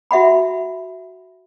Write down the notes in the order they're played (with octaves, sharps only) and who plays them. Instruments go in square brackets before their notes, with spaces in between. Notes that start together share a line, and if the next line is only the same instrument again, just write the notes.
[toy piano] F#4 E5 F#5 B5